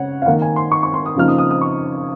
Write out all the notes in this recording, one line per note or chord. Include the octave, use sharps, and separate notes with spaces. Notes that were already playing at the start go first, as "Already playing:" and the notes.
Already playing: C#3 C#5 F#5
F5
D#3 A#3 D#4 F#5
G#5
C6
C#6
C#6
C6
D#6
C#3 F3 A#3 D#4 F6
D#6
D#6
D#6
C#6